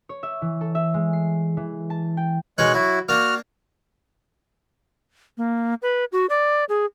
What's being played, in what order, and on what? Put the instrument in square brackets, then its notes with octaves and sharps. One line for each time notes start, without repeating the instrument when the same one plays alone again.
[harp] C#5
E5
E3
A4
E5
G#3
C7
E3
A5
G5
[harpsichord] B2 D#4 A#4 [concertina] G#3 C#5 F#6
[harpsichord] F#3 [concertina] E4 F#4
[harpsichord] A#3 D4 [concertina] F#4 F6
[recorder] A#3
B4
F#4
D5
G#4